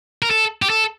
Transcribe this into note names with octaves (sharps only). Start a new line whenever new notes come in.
A#4
A4
G4
A4